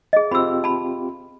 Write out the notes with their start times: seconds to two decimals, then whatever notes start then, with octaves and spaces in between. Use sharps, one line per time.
0.13 G#4 D#5
0.31 C4 F4 G4 B5 E6
0.64 A5 B5